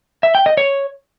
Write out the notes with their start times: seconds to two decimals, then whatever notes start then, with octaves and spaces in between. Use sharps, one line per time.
0.23 E5
0.35 G5
0.46 D#5
0.57 C#5